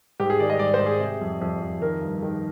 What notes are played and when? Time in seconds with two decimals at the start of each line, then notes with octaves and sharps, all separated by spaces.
0.20 G#2 G4
0.30 G#4
0.39 D#3 D5
0.50 D#5
0.59 G#2 D5
0.74 C5
0.79 G#2
0.86 G#4
1.00 C3
1.21 F2
1.41 F2
1.62 F2
1.81 D#3 A#4
2.01 G2
2.22 D#3